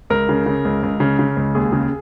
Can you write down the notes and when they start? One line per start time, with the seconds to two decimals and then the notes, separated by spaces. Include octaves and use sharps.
0.10 C#2 A#4
0.29 C#3
0.46 C#3
0.65 C#2
0.83 C#2
1.00 C#3
1.19 C#3
1.37 C#2
1.55 D#2 G#4
1.72 C#3